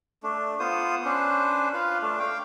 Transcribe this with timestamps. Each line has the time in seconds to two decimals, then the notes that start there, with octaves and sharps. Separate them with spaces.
0.23 A3 D4
0.60 B3 F4 C5 D#6
1.05 C#4 D4 B4 C5
1.74 F4 B4 F5
2.02 A3 D4
2.19 F5 G5